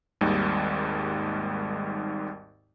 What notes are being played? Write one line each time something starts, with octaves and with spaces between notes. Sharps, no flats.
G#1 D#2 G#2 G3